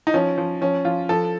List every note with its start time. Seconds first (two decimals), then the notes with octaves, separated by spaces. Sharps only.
0.07 D#4
0.14 F3 C#4
0.38 F3
0.61 F3 C#4
0.85 F3 F4
1.09 F3 A4